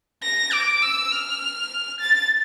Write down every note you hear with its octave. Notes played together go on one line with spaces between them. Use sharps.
A#6
D6
E6
F6
A6